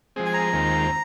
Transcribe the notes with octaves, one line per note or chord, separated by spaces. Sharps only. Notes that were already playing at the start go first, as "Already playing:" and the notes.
F3 G#3 C4 G#4
G#5
A#5
D#2 D#3 G#3 C4 F4